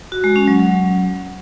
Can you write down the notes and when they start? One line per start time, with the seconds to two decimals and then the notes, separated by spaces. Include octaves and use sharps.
0.12 F#4
0.24 G#3
0.36 C#4
0.48 F#3
0.59 F#3